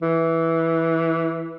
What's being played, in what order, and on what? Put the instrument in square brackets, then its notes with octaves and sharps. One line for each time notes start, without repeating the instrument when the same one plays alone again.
[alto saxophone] E3